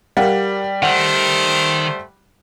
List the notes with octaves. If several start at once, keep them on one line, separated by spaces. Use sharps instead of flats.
G3 A#4 F5 F#5
D#3 A3 C5 F#5